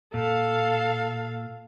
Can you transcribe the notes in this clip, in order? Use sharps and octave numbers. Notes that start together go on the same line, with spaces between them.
A#2 A4 F5